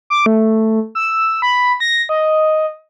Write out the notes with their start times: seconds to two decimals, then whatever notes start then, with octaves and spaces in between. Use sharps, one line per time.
0.10 D6
0.26 A3
0.95 E6
1.42 B5
1.80 A#6
2.09 D#5